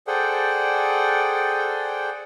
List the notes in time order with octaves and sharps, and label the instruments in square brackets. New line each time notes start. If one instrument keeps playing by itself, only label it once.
[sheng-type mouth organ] G#4 A4 C5 D5 F#5 G5